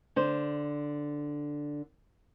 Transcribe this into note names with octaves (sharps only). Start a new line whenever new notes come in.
D3 C5